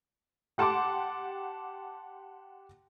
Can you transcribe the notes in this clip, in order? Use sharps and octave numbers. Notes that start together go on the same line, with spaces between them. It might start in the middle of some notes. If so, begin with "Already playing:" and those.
G4 F#5 A5 C6 D6